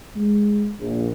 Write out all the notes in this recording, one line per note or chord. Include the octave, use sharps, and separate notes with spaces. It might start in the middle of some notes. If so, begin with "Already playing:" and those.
G#3
A#1